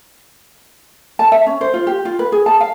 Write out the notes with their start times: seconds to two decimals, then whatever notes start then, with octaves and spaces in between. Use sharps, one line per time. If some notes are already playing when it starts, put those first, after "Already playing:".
1.19 A5
1.32 E5
1.46 C#4
1.61 C5
1.74 F4
1.87 G4
2.05 F4
2.19 B4
2.32 G#4
2.46 A5
2.61 F5